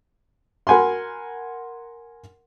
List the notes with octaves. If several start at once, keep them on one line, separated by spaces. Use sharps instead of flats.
A#4 F#5 G#5 B5 C6